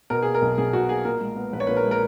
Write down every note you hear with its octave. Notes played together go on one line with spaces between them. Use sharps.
B2 A#4
A#3 G#4
A#4
B1
B1 G#4
B2 F#4
A#3 G#4
A#2 A#4
G#3
B3
A#1 B4
C#5
A#2 B4
A#4
G#3
A#4